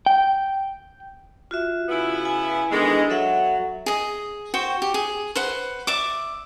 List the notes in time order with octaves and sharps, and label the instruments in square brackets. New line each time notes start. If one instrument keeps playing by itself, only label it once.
[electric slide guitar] G5
[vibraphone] F4 F#4 E5
[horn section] C#3 B3 E4
[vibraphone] G#5
[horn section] D#3 E3 G#3 [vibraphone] B3 D4 A4
[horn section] F#3 [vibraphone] A4 E5 F#5
[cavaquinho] G#4 D#5
F#4 C5 G5
G4
G#4
B4 C5 F#5
D5 E5 D6